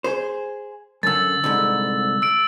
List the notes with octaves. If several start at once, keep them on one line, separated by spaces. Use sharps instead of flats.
G#4 C5
F#2 D3 E6 A6
C2 G#2 D3
E6 D7